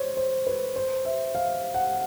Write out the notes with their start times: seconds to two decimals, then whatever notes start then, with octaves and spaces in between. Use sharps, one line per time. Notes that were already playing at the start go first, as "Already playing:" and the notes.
Already playing: C5 C#5
0.17 C5
0.46 B4
0.76 C5
1.05 E5
1.35 F5
1.74 F#5